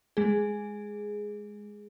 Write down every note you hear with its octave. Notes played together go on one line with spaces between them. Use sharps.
G#3 G#4